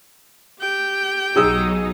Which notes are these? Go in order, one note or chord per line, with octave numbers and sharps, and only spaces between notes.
G4 G5
B1 F#3 D#4 G#4 D#6 E6